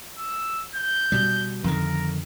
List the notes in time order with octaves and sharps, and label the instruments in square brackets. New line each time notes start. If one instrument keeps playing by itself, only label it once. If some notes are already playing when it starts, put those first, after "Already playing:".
[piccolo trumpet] E6
G6
[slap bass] B2 G3
[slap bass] F2 D3 D#3 [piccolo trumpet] A#4